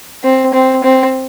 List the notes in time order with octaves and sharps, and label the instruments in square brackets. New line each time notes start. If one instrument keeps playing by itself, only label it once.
[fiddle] C4
C4
C4